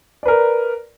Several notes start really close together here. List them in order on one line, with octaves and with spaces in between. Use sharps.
D5 B4 A#4